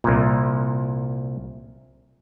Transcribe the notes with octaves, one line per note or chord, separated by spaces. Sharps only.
C2 A#2